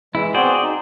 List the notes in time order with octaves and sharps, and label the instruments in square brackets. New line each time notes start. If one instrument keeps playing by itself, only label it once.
[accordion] E3 G#3 [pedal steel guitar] E4
[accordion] B3 C4 F#4 [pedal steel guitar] G#4 C5 D5
[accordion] D#4